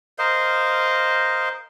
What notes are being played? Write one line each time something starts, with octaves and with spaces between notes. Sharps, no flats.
A#4 C5 D#5 F5